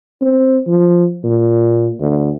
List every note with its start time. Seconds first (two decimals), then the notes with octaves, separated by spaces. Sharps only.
0.22 C4
0.67 F3
1.24 A#2
2.00 D2